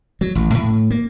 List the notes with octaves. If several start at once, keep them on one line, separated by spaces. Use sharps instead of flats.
F#3
A1
A2
A#3